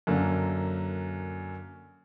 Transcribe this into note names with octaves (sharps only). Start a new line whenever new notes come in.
F#2 D3 A#3